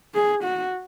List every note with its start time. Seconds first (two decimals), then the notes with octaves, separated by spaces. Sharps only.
0.14 G#4
0.43 F#4